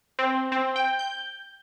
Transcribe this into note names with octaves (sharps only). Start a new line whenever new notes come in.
C4
C4
G5
G6